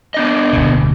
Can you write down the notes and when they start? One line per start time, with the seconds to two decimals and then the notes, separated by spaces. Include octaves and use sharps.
0.14 B3 D4 D#5
0.53 D1 B2